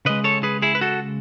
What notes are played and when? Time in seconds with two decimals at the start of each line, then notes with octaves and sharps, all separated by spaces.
0.05 C#3 G#3 B4 D#5
0.24 A4 C#5
0.43 G#4 B4
0.62 E4 G#4
0.75 B4
0.81 F#4 A4